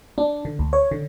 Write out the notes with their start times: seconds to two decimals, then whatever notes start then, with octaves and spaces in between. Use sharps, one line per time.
0.18 D4
0.45 D3
0.59 D2
0.73 C#5
0.91 D3